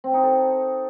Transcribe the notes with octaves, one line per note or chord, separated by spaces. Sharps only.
C4
D#4
A4